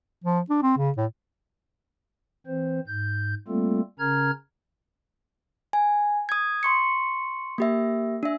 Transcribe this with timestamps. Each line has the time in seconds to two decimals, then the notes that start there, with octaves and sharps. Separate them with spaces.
0.24 F3
0.50 D4
0.63 C4
0.77 C#3
0.97 A2
2.46 E3 C4 C5
2.87 G#2 G6
3.48 G3 A3 A#3 C4 F4 A4
3.99 C#3 C#4 A#4 A#5 F6 G#6
5.73 G#5
6.29 D#6 G#6
6.63 C6 C#6 C#7
7.58 A#3 G4 E5
8.23 D4 E5